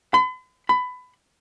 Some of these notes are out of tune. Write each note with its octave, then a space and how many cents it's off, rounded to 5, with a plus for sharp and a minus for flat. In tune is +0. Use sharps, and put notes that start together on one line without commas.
B5 +45
B5 +20